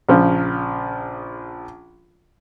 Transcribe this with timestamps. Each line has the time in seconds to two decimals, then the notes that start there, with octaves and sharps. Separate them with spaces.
0.08 A#1 C#3 F3